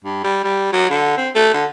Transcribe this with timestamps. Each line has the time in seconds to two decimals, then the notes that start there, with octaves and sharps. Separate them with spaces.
0.04 G2
0.24 G3
0.44 G3
0.73 F#3
0.90 D3
1.17 C4
1.35 A3
1.54 D3